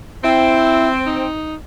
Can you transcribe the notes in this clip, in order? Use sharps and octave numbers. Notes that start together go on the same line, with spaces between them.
C4 E4
D#4